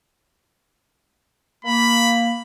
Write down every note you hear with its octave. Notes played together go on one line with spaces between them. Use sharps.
A#3 B5